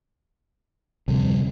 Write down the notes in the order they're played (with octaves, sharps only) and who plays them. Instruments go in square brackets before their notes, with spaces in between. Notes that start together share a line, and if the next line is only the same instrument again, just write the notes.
[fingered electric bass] D1 F2 G3 [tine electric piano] C3